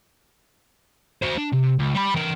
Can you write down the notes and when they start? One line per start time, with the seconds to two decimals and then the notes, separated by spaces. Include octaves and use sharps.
1.22 F#4 C5
1.37 D4
1.52 C3
1.79 C#2
1.94 G3 B5
2.14 E3 A#4